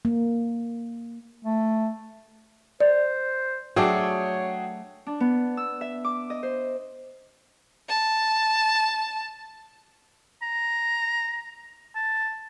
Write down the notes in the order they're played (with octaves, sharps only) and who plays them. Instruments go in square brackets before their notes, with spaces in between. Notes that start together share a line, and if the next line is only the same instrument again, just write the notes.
[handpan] A#3
[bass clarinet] A3
[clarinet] C5 [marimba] D5
[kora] F#3 A3 D4 [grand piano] F#4 G#4 G5 [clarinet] C#5
[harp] D4
B3
E6
E5
D6
D#5
C5
[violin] A5
[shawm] A#5
A5